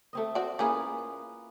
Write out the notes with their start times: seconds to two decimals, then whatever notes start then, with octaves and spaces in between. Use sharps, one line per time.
0.13 A3 C4 D#5
0.35 F#4 C5 D5
0.59 C#3 A#3 B3 E4 F4 G#4